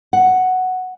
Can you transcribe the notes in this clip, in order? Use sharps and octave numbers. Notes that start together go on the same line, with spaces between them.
F#5